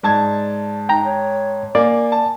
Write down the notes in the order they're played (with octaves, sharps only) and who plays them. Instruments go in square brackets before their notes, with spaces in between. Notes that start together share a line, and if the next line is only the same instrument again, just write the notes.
[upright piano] G#2 A5 G#6 [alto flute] D5
[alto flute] D#4 [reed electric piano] G5 A#5
[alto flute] C#5
[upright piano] A#3 [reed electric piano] D5 [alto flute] G#5
[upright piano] A5